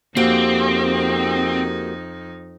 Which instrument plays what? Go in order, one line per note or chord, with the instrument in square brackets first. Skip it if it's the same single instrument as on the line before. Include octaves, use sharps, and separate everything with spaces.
[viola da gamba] F2 D#4 [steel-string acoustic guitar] A#3 F#4 G4 [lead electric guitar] C4